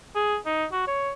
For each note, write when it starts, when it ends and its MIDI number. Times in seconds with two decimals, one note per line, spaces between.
0.15 0.38 68
0.46 0.65 63
0.72 0.85 66
0.87 1.12 73